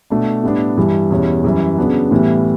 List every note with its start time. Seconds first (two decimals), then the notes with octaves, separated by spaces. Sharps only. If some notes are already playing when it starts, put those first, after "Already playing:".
0.10 B2 A3 D4
0.43 A2 G3 B3 D4
0.77 G2 E3 G3
1.11 E2 B2 G3 C#4 E4
1.44 F#2 E3 G3
1.78 C#3 F#3 B3 D4
2.11 A2 E3 G3 B3